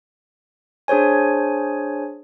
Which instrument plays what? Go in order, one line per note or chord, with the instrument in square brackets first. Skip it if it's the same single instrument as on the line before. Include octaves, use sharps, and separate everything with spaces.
[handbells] D4 G#4 C5 C#5 G#5